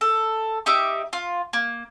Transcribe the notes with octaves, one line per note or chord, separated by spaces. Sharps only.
A4
D#4 G4 E5
F4
A#3